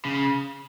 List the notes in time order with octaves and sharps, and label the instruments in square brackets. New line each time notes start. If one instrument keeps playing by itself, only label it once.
[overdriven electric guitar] C#3